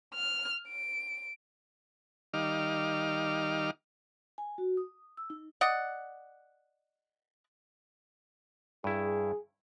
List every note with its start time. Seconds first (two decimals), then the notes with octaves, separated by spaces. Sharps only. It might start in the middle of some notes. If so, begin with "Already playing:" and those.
0.14 F6
0.68 D7
2.34 D#3 G3 D#4 F5 D6 F6
4.38 G#5
4.58 F#4
4.77 D#6
5.17 E6
5.30 D#4
5.61 D5 D#5 F#5
8.84 G2 E4 G#4